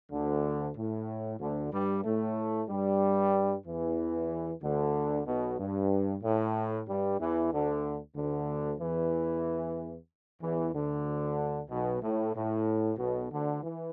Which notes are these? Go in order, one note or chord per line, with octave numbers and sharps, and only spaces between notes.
D2 D3
A2
D2 D3
G2 G3
A2 A3
G2 G3
E2 E3
D2 D3
B1 B2
G2
A2
G2 G3
E2 E3
D2 D3
D2 D3
E2 E3
E2 E3
D2 D3
B1 B2
A2
A2
B1 B2
D2 D3
E3